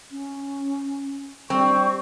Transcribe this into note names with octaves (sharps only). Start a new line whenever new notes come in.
C#4
G3 C4 C#6